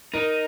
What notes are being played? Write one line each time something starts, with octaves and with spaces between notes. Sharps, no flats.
D#4 A#4